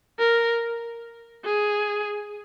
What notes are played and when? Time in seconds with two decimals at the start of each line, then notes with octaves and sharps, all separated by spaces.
0.19 A#4
1.45 G#4